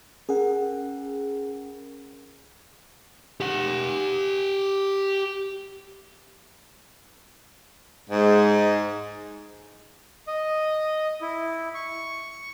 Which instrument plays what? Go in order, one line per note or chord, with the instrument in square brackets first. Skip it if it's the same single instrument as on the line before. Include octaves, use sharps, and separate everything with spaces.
[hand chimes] C#4 A#4 F#5 [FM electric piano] G#4
[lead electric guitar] G4 F#5
[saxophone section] G#2
[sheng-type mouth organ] D#5
E4
C#6